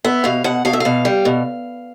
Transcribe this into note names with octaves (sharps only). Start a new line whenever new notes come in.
B3 E5
B2 F5
B2 F#5
B2 F5
E5
B2 F5
G3
B2